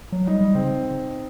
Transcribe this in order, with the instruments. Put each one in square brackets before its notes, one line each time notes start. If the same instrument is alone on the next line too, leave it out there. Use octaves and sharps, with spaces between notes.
[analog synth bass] F#3
[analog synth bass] G3 [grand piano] D#4
[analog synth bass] G3
[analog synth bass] C#3 [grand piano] C4